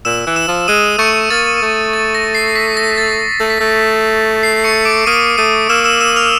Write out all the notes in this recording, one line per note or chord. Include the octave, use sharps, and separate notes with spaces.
A#2 E6 E7
E3
E6 E7
F3
G#3 D#6 D#7
A3 C#6 C#7
A#3 A6
A3
A6
A#6
C7
B6
A#6
A6
A3
B6
A3
C7
C#6 C#7
D6 D7
A#3 D#6 D#7
A3 D#6 D#7
A#3 E6 E7
E6 E7
E6 E7
F6 F7